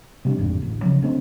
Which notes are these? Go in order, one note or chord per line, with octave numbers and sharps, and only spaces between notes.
C3 G3 D4
A1 F2 G#2 D3
A1 D2
C#3 F3 F#3
D3 A3 C4